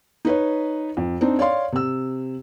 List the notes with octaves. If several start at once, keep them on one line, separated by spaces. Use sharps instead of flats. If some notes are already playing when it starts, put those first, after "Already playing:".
D#4 B4 C#5
F2
C4 D4 D#4
C#5 D5 F5 C6
C3 E6